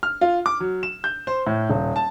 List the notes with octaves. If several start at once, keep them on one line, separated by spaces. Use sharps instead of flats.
F6
F4
D6
F#3
E7
G6
C5
A2
D#1
A5